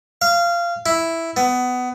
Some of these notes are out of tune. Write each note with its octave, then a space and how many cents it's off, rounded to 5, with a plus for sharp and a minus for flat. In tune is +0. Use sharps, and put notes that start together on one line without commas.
F5 -20
E4 +0
B3 +20